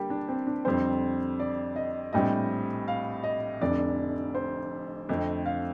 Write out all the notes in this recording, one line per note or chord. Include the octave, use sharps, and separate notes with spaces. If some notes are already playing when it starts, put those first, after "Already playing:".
Already playing: D3 G3 A#3 G4
D4
C4
D4
F2 D3 G3 C4 C5
D5
D#5
A#1 A2 G3 C4 D#5
F5
D#5
F1 F2 D3 D5
C5
F2 D3 A3 C4 D#5
F5